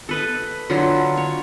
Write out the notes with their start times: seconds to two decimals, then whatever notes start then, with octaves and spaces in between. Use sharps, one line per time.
0.09 A4 B4 D#5
0.70 D3 F#3 E4 F4
1.17 C#5